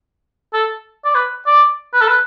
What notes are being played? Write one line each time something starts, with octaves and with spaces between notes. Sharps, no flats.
A4
D5
B4
D5
B4
A4
B4